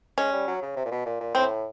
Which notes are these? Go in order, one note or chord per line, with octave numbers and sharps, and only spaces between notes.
G#3 C#4
G3
F#3
C#3
C3
A#2
B2
A#2
A#2
A2 C4